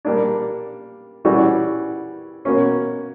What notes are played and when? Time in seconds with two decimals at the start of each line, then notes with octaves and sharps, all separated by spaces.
0.05 G3 A#3 D4
1.25 E3 G3 C#4 F#4
2.45 B2 A#3 C#4